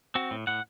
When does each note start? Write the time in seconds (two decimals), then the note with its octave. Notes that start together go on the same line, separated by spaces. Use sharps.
0.15 C4 F#4
0.31 A2
0.47 A2 F#5